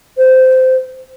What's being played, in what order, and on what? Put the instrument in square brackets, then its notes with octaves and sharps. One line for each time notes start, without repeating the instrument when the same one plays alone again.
[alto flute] C5